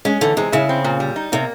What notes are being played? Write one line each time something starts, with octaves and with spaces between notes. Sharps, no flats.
G#3 C#4
D3 E3
C3 G#3
C#3 E4
C4
A#2
G3
D#4
C3 A#3